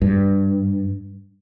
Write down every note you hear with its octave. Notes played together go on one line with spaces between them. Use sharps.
G2